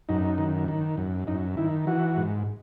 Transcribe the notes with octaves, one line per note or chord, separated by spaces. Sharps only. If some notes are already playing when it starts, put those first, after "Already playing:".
F#2 D#4
D#3
D#3
F#2
F#2 D#4
D#3 E4
E3 F#4
G#2